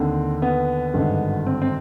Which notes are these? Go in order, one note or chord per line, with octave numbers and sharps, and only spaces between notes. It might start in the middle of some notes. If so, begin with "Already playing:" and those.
Already playing: D#2 D3 C4
B3
G#1 G2 D3
C4
C4